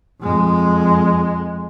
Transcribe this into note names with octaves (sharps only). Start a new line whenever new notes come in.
F2 G#3